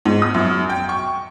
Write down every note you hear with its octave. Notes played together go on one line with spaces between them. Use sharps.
G#2
D#6
F#2
G5
C#6